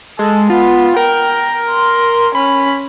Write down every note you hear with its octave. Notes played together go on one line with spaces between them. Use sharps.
G#3 A4
B3 F4
A#4 G5
C6
C#4 B5